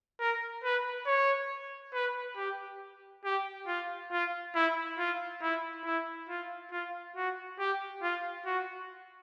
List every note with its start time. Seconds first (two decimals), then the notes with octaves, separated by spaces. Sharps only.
0.20 A#4
0.64 B4
1.06 C#5
1.94 B4
2.37 G4
3.25 G4
3.67 F4
4.12 F4
4.55 E4
4.99 F4
5.42 E4
5.85 E4
6.29 F4
6.72 F4
7.16 F#4
7.59 G4
8.02 F4
8.46 F#4